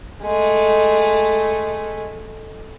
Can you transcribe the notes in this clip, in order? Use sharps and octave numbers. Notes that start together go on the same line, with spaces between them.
G#3 A3